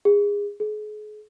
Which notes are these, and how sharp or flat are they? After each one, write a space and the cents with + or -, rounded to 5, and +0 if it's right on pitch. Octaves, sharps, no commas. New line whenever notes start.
G#4 -25
G#4 +40